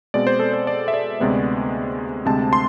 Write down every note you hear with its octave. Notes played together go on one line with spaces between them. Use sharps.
B2 G#3 C4 D5
C5
A4
C5
D5
E5
D5
D2 C3 G#3 B3
D2 C3 G#3 C4 A5
C6